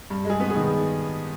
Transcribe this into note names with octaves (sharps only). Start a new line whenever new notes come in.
G2
G#3 G#4
B3
G#4
D#3